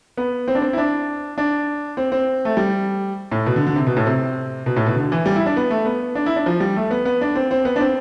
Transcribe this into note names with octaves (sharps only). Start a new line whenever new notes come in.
B3
C4
D4
C4
E4
D4
D4
C4
C4
A3
G3
A2
B2
D3
D3
C3
B2
A2
C3
B2
A2
B2
D3
E3
G3
E4
D4
B3
A3
B3
D4
E4
D4
F3
G3
A3
B3
B3
D4
C4
C4
B3
D4
C4